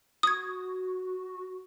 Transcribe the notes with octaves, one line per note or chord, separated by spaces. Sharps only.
F#4 D#6 G#6